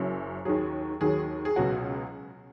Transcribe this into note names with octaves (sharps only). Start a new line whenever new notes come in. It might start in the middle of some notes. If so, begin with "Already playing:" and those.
Already playing: F#1 F#2 F#3
D#2 D#3 F#3 G#4
D#2 D#3 F#3 G#4
G#4
C#2 B2 F#3 F#4